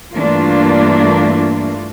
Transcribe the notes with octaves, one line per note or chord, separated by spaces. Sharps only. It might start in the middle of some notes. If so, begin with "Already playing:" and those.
G2 E3 A3 A#3 D4 F4